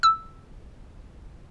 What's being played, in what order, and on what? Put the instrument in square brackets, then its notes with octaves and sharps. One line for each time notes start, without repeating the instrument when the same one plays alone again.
[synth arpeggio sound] E6